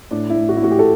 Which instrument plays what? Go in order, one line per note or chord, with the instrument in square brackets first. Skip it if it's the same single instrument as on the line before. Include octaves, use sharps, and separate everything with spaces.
[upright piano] A2 D4
E4
A2
F#4
E4
A2 F#4
G4
A4